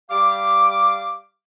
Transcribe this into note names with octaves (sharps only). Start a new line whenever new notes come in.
G3 F5 D6